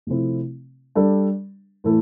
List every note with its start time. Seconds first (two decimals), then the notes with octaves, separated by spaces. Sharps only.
0.07 C3 F3 A3 C4 E4
0.95 G3 D4 A4
1.84 A2 E3 A3 E4 A4